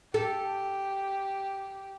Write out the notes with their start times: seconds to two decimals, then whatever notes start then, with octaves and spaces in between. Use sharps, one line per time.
0.14 G4 A4